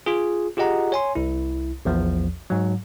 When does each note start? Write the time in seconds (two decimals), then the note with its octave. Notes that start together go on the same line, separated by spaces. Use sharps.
0.06 F4 G#4
0.57 F4 G4 G#4 D#5 F#5 A#5
0.92 C#5 G#5 C6
1.15 C2 E4
1.85 A#1 E2 F3
2.50 G#2 F#3